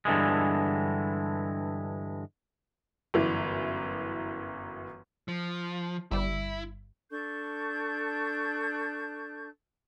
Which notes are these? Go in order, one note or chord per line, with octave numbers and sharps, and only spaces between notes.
G2 D3 E3 G#3
G1 F#2 E3
F3
G1 G3 E4
D4 A4 C#6 G6